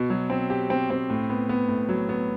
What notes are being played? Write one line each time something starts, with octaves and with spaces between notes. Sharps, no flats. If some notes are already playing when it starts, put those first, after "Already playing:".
Already playing: B2
F#3
C4
G4
C4
C4
A2
B3
B3
A2
F#3
B3